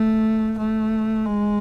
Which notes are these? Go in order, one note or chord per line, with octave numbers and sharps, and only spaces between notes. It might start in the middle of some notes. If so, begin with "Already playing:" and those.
Already playing: A3
A3
G#3